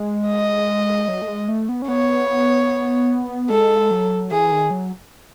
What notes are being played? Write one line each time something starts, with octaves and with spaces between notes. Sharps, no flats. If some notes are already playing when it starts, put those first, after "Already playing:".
Already playing: G#3
D#5
F#3
A3
G#3
A3
B3
C#4
B3 C#5
G#3 A4
F#3
E3 G#4
D#3
F#3